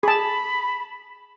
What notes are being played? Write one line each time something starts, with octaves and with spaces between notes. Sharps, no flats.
G#4 A5 B5